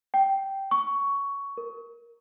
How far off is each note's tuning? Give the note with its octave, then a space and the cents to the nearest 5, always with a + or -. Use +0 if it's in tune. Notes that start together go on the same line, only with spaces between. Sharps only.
G5 -10
C#6 +10
A#4 +5